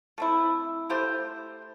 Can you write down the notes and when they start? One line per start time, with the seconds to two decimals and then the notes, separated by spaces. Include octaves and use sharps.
0.18 A3 C4 E4
0.90 A3 E4 G4 C5